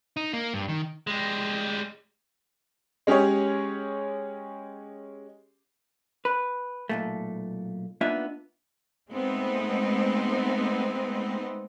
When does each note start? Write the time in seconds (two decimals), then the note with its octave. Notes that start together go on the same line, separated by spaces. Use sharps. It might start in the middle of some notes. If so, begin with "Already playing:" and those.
0.17 D#4
0.33 A#3
0.54 G2
0.69 D#3
1.07 G3 G#3
3.07 G#3 C#4 G4 G#4 C#5
6.25 B4
6.89 B1 A#2 A3
8.01 A#3 B3 D4 D#4 F4 E5
9.09 G#3 A3 B3 C4 D#4